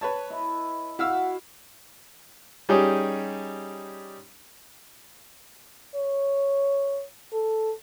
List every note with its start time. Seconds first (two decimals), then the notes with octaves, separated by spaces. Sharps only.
0.01 B4 C#5 A5
0.30 E4 D#5 E5
0.99 E4 F#4 F5 F#5 E6
2.69 G3 C#4 D#4 G4 G#4
5.95 C#5
7.33 A4